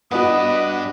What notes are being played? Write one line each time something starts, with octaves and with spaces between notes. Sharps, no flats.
G2 B3 D4 F#4 D#5 B5